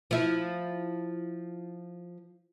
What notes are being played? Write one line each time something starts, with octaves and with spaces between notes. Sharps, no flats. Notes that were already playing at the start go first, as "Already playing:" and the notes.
F3 E4